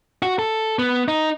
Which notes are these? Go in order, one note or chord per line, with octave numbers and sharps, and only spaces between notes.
F#4
A4
B3
D#4